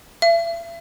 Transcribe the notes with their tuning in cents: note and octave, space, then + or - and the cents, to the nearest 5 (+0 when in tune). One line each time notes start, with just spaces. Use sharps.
E5 +40